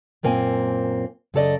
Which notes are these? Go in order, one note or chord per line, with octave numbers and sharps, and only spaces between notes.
F#2 A#2 A#3 C4 G#5
F#2 C#3 A4 D5 D#5